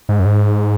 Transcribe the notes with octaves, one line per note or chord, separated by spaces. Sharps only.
G#2
F#2
G#2